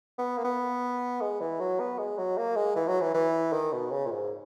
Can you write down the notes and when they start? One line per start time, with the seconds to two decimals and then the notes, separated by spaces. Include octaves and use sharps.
0.18 B3
0.38 A#3
0.45 B3
1.21 G#3
1.40 E3
1.60 F#3
1.80 B3
1.99 G#3
2.18 F#3
2.37 A#3
2.56 G#3
2.76 E3
2.88 F#3
3.01 E3
3.14 E3
3.53 D#3
3.73 B2
3.91 C#3
4.06 A#2
4.11 G#2